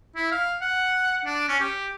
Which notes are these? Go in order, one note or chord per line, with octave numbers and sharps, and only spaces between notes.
E4
F5
F#5
D4
C#4
G4